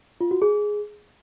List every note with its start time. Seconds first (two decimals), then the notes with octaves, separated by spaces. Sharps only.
0.21 F4
0.31 F#4
0.42 G#4